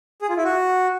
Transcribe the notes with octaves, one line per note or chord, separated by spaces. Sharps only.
G#4
F4
E4
F#4